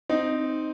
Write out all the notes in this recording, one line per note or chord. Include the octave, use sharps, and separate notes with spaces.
C4 D#4